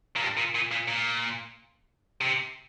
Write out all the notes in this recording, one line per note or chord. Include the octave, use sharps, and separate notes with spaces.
A#2
G2
A#2
A#2
A#2
A#2
C3